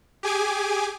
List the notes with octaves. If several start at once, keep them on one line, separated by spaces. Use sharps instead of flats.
G4 G#4 G#5 D6